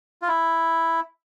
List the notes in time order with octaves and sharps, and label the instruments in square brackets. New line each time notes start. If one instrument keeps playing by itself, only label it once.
[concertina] F4
E4